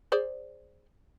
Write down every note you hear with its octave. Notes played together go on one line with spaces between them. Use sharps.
G#4 C5 D5